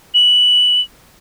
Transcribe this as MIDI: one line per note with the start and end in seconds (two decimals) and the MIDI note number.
0.14 0.81 102